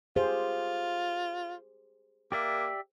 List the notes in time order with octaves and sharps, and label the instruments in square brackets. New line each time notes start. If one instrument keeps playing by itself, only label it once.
[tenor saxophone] F4 [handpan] G4 G#4 C5
[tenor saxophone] A#3 [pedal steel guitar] G4 D5 E5